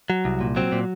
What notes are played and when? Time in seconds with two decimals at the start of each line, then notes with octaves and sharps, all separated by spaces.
0.10 F#3
0.25 C2
0.41 A#2
0.56 F#3 C4
0.72 A#2